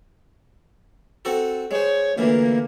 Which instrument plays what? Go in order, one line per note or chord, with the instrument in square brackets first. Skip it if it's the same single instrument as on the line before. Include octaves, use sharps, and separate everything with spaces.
[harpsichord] C4 F#4 A4
[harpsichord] G#3 C5 [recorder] C#5
[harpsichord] D2 A#2 E3 [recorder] A#3